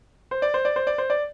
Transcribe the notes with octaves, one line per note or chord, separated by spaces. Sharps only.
C5
D5
C5
D5
C5
D5
C5
D5